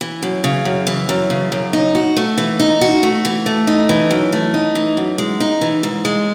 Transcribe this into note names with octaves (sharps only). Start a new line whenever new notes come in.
E3
F#2
C#3
F#2
E3
F#2
C#3
F#2
D#4
F#4
A3
E3
D#4
F#4
A3
E3
A3
D#4
E3
F#2
A3
D#4
E3
F#2
G#3
D#4
E3
G#2
G#3